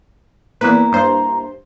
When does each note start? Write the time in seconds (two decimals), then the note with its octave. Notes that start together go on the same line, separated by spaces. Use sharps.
0.61 E2 A#3 E4 B4 A#5
0.92 G2 C5